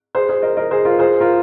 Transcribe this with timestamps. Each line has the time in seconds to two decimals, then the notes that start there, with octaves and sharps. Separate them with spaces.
0.15 G#4 C5
0.29 G#4 C5
0.42 A#4 D#5
0.57 A#4 D#5
0.71 G#4 C5
0.85 F4 A#4
0.99 G#4 C5
1.20 F4 A#4